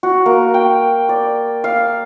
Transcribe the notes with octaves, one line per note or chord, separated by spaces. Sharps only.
F#4
A#3
G5
D5
F5